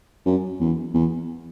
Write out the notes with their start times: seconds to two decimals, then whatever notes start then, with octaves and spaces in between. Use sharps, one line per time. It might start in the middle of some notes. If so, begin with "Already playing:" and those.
0.25 F#2
0.60 E2
0.94 E2